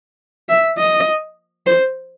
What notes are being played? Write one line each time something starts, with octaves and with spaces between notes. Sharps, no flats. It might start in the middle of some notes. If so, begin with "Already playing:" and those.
E5
D#5
C5